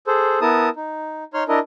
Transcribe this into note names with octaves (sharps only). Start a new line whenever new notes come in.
G#4 A4 C5
B3 E4 A#4 A5 D#6
D#4
D#4 C#5 C6 F6
D4 E4 A#4 D#5